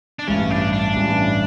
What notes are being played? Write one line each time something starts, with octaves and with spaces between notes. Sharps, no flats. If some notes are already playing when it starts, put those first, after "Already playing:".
D4
A1 G2 E3 C#4
D4
D4
A1 G2 E3